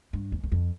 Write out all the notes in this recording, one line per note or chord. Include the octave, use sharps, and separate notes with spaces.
G2
E2
E2
F2